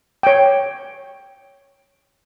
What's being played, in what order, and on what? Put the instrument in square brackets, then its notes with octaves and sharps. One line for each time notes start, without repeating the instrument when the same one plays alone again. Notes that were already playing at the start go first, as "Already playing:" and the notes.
[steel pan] C#5 G5